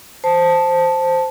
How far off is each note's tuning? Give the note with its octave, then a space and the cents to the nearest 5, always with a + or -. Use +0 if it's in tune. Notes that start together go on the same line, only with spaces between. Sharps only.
C5 +0 A5 +0